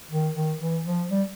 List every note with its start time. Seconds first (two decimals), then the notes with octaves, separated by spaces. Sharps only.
0.11 D#3
0.35 D#3
0.60 E3
0.85 F3
1.10 G3